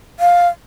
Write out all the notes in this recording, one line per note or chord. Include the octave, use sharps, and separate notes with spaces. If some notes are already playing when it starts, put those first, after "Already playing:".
F5